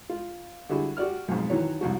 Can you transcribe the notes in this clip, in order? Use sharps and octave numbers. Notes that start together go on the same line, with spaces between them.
F4
D3 G3 E4 F#4 G#4
F#4 G4 D5 F6
B1 F2 G#2
D#3 E3 F#3 C#5
C2 F2 F#4